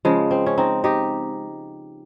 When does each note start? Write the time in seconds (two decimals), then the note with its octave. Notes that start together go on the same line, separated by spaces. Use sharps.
0.05 C#3 F3 G#3
0.31 C4
0.46 C#4
0.58 C4 D#4
0.84 D#4 G4